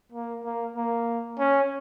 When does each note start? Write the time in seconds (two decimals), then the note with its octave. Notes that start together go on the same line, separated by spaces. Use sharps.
0.12 A#3
0.44 A#3
0.76 A#3
1.39 C#4